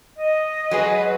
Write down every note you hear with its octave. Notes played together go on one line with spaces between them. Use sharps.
D#5
F#3 G#3 G#4 B4